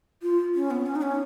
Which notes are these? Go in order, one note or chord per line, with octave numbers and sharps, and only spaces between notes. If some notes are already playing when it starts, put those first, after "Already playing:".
F4
C#4
B3
C#4
D#4
C#4